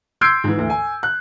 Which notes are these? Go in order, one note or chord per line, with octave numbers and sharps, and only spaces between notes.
C6 E6 G6 G#6 C7 D7
G#2 E3
D2 E3
G#5
F#6